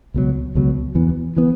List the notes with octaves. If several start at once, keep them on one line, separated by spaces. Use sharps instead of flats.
C#2 B2 F#3
C#2 B2 F#3
E2 E3 B3
E3 B3